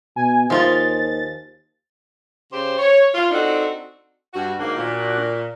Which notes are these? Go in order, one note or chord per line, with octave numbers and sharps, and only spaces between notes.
B2 G#5
D#2 F3 F4 G#4 A6
C#3 G4 C5
C#5
F4
C4 D4 D#4 F#4 A4
G2 F#4
G#2 D#3 A#3 D4 F#4
A#2